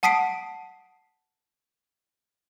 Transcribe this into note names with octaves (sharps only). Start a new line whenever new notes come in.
F#5 A5 D#6 B6 C7 D7